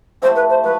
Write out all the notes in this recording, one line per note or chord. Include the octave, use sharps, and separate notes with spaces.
F3 A3 E4 G4 C5
B4
C5
F3 A3 B4